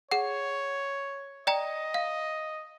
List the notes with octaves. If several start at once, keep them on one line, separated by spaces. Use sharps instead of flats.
G#4 C#5 F#5
D5 D#5 G5 A#5
F5